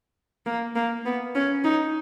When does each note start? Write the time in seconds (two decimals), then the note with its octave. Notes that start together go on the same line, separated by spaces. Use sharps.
0.46 A#3
0.76 A#3
1.05 B3
1.35 C#4
1.64 D#4